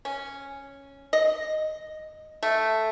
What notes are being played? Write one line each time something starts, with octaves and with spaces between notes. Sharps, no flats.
C#4
D#5
A3